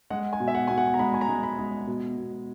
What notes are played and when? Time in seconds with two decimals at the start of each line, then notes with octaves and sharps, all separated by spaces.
0.10 G#3 F#5
0.33 G#5
0.40 B2
0.48 E5
0.55 F#5
0.67 B2 G#5
0.78 F#5
0.94 A#5
0.99 G#3 B5
1.14 G#5
1.21 A#5
1.28 G#3
1.43 B5
1.59 G#3
1.87 B2
2.17 B2